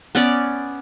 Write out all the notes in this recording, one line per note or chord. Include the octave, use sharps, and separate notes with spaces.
B3 C#4 D5